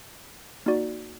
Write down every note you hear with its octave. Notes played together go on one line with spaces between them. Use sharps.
A#3 D#4 F#4 D5